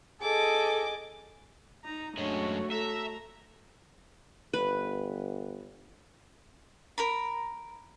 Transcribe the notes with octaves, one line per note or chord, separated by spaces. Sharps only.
G#4 A4 D#5 D6
D#4 A#5
F#2 G#3 A3 D4 F#4 C#5
A4 E5 A#5
G1 B4
A#4 A#5 B5